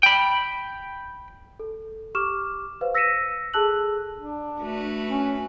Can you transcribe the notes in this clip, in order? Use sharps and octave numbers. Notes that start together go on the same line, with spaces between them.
G5 B5
A4
G4 C#6 D6 F6 E7
B4 C5 F5
E6 A#6 B6 C#7 D#7 E7
G#4 A4 A5 E6 F#6 F#7
D4
A3 F#4 B4
C#4